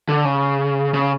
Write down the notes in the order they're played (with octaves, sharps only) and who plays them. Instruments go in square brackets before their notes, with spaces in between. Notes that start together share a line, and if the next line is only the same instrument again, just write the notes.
[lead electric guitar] D3
C#3
C#3